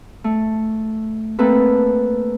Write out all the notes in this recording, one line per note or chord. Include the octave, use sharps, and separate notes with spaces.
A3
A3 A#3 C4 A4 B4